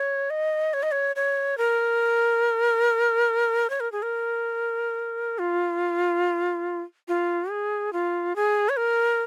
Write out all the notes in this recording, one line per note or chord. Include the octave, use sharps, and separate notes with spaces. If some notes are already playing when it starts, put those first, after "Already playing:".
Already playing: C#5
D#5
C#5
D#5
C#5
C#5
A#4
C#5
A#4
G#4
A#4
F4
F4
G#4
F4
G#4
C#5
A#4